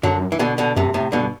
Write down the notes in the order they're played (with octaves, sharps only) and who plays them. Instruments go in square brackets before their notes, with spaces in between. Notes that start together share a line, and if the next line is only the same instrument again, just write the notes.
[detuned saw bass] F#2 [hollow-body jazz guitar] D3 F#3
[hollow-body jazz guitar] E3
B2 D3
B2 D3
[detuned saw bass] F#2 [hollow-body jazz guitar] A2 C3
[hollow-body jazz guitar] A2 C3
[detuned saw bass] G2 [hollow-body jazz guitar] B2 D3